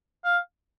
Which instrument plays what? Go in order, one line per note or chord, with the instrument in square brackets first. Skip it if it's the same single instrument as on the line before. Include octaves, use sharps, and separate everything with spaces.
[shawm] F5